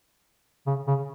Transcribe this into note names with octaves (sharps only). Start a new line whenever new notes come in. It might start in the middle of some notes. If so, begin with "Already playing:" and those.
C#3
C#3